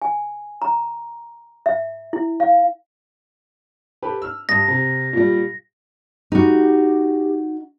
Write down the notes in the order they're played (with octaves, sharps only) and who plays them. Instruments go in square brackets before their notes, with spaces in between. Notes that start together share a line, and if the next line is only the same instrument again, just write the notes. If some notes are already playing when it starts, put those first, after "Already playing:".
[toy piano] G#5
A#5
E5
E4
F5
[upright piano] G4 A4 B4
E6 F6
[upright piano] G2 D#6 [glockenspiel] A#6
[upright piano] C3
A#2 G3
[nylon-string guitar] D#4 F#4 [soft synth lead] G4